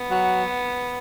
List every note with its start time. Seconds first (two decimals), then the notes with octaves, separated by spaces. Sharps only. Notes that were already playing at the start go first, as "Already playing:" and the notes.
Already playing: B3
0.11 F#3